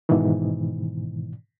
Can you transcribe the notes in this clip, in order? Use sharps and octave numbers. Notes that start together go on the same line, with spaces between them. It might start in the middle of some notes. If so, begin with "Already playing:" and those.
G#2 B2 D#3 E3